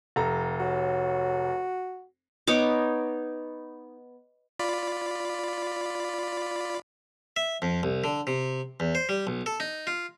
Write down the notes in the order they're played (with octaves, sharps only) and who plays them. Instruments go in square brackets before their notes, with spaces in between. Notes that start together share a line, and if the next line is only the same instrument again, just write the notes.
[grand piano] F1 A4 A#5
[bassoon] F#4 [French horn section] C#5
[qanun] B3 D#4 C#5 D6
[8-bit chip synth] F4 D5 B5
[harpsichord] E5
F2
C2
D3
C3
E2
C5
G3
B1
A4
D#4
F4